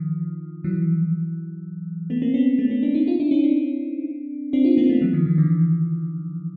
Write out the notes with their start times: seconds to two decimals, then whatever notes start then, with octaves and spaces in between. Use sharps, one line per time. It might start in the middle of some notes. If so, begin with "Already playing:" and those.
Already playing: D#3 F3
0.64 E3 F#3
2.10 A3 B3
2.22 A#3 C4
2.34 B3 C#4
2.59 A3 B3
2.70 B3 C#4
2.83 C4 D4
2.94 C#4 D#4
3.07 D#4 F4
3.20 D4 E4
3.31 C#4 D#4
3.44 C4 D4
4.53 C4 D4
4.64 D#4 F4
4.77 A#3 C4
4.89 A3 B3
5.01 E3 F#3
5.13 D#3 F3
5.26 D#3
5.38 D3 E3